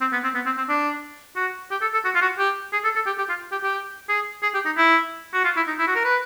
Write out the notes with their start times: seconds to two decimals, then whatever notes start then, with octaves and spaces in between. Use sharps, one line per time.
0.01 C4
0.12 B3
0.24 C4
0.35 B3
0.45 C4
0.58 C4
0.69 D4
1.36 F#4
1.71 G4
1.82 A4
1.94 A4
2.05 F#4
2.15 F4
2.22 F#4
2.39 G4
2.73 G#4
2.84 A4
2.95 A4
3.06 G4
3.18 G4
3.29 F4
3.52 G4
3.63 G4
4.09 G#4
4.43 G#4
4.54 G4
4.65 D#4
4.77 E4
5.34 F#4
5.45 F4
5.56 E4
5.67 D#4
5.79 E4
5.87 F#4
5.95 A#4
6.04 B4